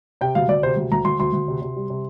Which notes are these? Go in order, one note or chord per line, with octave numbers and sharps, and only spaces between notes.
C3 G5
D2 F5
D2 D5
C3 C5
D2
D2 A#5
D2 C6
D2 C6
D2
C3
C3
G3
C3